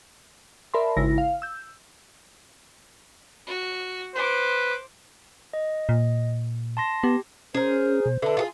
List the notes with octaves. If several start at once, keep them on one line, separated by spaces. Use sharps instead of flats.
A#4 D5 E5 A5 B5 C6
G#1 C#3 E4 A#6
F5
E6 G6
F#4
B4 C5 D6
D#5
A#2
A5 C6 A#6
B3 G4
C#4 G#4 A#4 C5
B2
D3 D4 A4 B4 E5
F4 F#4 G#4